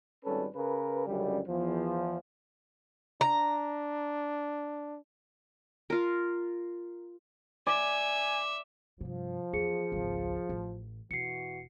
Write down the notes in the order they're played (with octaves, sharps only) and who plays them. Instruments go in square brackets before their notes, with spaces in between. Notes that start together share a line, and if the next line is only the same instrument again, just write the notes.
[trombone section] G#1 G3 C#4 A4 B4
C#3 A#4 B4
C#2 F#2 D3 G3
E2 F3
[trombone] D4 [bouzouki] A#5
[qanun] F4 A#4
[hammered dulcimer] D5 [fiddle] E5 [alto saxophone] G#5
[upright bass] G2 C3 [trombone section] F3
[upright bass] E2 [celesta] G#4 C#7
[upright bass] G#1 C#2
A1
[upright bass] E1 [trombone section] E3 F#4 [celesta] C7 C#7